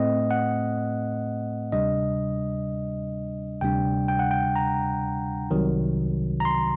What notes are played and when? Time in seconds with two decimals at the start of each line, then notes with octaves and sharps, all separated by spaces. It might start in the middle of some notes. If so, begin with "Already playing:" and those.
Already playing: A2 A3 C4 D#5
0.31 F#5
1.72 D2 C3 G3 D4 D#5
3.61 D2 C3 G3 D4 G5
4.08 G5
4.19 F#5
4.31 G5
4.56 A#5
5.51 C2 C3 D#3 F#3
6.40 A#5
6.45 C6